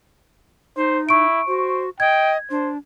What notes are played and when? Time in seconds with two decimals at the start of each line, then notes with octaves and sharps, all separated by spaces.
0.77 D#4 C5
1.09 E4 C#6 D7
1.48 F#4 C5
2.00 D#5 G5 G#6
2.51 D4 C5